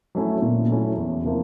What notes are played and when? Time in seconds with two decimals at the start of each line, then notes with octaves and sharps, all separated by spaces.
0.15 F#3 A3 C#4 E4
0.42 A#2
0.69 F#3 A3 C#4 E4
0.97 E2
1.24 C3 F3 A#3